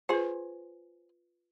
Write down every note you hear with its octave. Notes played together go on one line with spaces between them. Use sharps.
F4 G#4 B4 C5